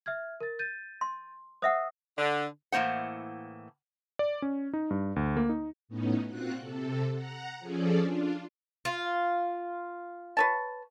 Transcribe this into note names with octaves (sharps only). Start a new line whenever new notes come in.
E5 F6 G#6
A#4 A6
G6 A6 D#7
C6
C5 E5 F#5 D#6 E6
D3
A2 E3 A#3 C5 F#5
D5
C#4
D#4
G2
D2
A#3
D#4
A2 B3 C#4 D#4
A#2 C4 F4 F#4 F#5 F#6
C3 A4
F#5 A#5
F3 C#4 G#4 A4 D5
D4 F4
F4
B4 C#5 A5